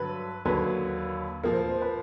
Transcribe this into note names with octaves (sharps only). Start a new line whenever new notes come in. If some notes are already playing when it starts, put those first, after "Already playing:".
Already playing: G2 D3 F#3 B4
D#2 D3 F#3 A#3 B4
A#2 F3 A#3 A#4
C5
B4
C5
B4